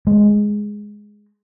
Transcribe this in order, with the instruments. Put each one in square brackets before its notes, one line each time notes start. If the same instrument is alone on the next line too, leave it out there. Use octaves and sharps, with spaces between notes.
[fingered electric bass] G#3